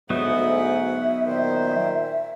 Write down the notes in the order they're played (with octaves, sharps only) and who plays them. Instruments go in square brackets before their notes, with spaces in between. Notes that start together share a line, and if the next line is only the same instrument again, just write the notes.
[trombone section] D2 G#2 [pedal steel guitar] F#3 B3 D#4 [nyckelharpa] F#4 F#5 [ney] E5
[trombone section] A#2 D#3 [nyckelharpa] C5